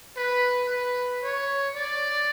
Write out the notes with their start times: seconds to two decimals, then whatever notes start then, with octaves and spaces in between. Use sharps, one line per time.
0.17 B4
0.69 B4
1.23 C#5
1.76 D5